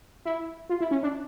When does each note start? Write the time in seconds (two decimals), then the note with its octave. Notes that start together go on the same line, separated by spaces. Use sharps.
0.25 E4
0.69 F4
0.81 E4
0.91 C#4
1.03 D4